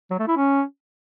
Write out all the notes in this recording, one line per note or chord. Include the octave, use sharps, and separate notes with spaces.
F#3
A3
E4
C#4